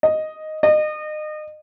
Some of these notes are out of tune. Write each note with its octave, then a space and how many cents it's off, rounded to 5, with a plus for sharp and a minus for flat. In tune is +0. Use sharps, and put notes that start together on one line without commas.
D#5 +0
D#5 -30